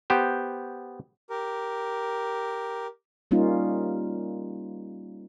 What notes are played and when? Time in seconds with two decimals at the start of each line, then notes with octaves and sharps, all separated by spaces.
0.10 B3 G4 C5
1.30 G4 A#4
3.31 G3 A#3 C#4 D#4 F4